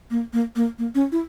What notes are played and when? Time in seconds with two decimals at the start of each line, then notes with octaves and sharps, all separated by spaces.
0.11 A#3
0.33 A#3
0.56 A#3
0.79 A#3
0.95 C#4
1.12 E4